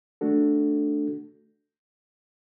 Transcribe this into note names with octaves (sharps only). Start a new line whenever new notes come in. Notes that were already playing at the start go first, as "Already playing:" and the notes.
A3 D4 F#4 A4